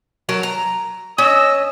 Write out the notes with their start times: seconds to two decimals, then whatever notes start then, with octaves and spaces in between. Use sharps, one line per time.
0.29 F#3 A#4 A5
0.43 A#5
1.18 C#4 D#5 E6